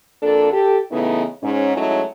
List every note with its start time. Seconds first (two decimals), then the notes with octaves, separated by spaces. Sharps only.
0.22 F2 A#3 D4 A4
0.52 G4 A4
0.91 A2 C#3 E3 B3 D#4
1.43 G#2 C#4
1.77 F#3 G#3 A3 C#4 D#4 E4